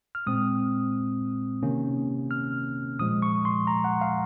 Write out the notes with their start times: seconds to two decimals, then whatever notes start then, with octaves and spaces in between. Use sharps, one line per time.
0.15 F6
0.27 A#2 G#3 C4 D#6
1.63 C3 D#3 A#3 C#4
2.31 F6
2.99 A#2 F3 G#3 D#6
3.22 C#6
3.45 C6
3.67 A#5
3.84 F#5
4.01 F5